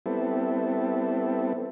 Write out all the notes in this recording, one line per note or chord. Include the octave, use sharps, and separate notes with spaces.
G3 B3 C4 E4 A4